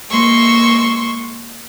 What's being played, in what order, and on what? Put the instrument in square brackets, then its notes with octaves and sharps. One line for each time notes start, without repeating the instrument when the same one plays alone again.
[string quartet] G#3 A#3 C6 C#6 E6